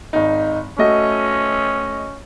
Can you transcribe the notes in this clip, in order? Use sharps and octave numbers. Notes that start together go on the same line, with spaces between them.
G#1 D#4
A3 C#4 F#4 D#5